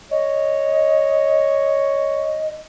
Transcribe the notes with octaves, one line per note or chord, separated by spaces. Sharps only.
C#5 D#5